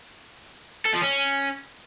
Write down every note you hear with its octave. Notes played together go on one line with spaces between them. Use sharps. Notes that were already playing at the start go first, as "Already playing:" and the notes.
A4
F3
C#4